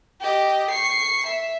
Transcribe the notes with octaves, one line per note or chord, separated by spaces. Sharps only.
G4 D#5
C#6 C7
E5